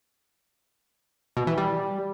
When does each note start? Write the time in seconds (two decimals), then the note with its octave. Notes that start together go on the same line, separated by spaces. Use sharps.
1.37 B2
1.47 E3
1.57 G3